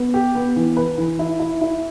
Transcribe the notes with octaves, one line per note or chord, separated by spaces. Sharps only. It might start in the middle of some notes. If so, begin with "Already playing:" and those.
Already playing: B3
G4
B3
E3
B4
E3
E4
E4
E4